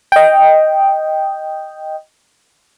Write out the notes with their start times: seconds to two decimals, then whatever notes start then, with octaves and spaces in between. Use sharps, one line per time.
0.12 D#5 G5